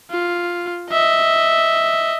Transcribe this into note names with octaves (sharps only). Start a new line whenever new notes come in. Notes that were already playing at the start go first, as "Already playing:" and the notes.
F4
D#5 E5